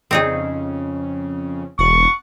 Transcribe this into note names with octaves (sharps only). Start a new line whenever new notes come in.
F2 C#3 C4 D#4 G#4
E1 F#5 C#6 A6